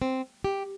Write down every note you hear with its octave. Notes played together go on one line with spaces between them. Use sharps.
C4
G4